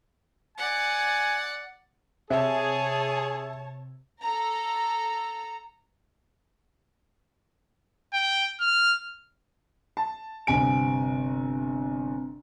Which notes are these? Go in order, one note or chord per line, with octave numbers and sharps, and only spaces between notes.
D5 F#5 G#5
C3 G#4 C#5 E5 A5
A4 A#5
G5
F6
A5
G1 C3 G#5 D7